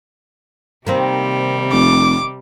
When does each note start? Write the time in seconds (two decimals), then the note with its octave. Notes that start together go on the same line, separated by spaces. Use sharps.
0.87 C3 D#3 G3 A#3 C4
1.72 F1 D6